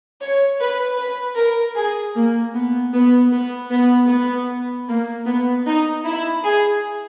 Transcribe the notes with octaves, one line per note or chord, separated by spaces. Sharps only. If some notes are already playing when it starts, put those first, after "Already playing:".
C#5
B4
B4
A#4
G#4
A#3
B3
B3
B3
B3
B3
A#3
B3
D#4
E4
G#4